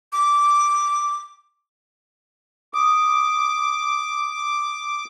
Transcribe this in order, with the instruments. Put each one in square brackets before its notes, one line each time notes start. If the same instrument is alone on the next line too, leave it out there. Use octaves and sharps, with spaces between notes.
[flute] D6
[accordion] D6 [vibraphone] D#6